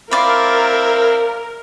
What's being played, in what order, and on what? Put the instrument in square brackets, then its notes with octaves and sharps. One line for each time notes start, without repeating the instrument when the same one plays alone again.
[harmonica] C4 E4 [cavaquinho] F4 D5 B5 [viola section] A#4